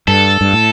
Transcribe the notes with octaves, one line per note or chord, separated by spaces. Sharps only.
G2 A4
G2
A2